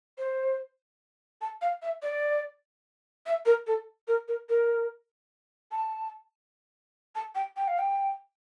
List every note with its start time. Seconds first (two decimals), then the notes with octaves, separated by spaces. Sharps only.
0.18 C5
1.41 A5
1.61 F5
1.82 E5
2.02 D5
3.26 E5
3.46 A#4
3.67 A4
4.08 A#4
4.28 A#4
4.49 A#4
5.72 A5
7.15 A5
7.35 G5
7.57 G5
7.68 F5
7.79 G5